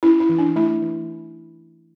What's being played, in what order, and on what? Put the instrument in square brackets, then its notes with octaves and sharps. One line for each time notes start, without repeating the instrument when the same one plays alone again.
[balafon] C#4 E4
E4
E3
D4
A3 E4
E3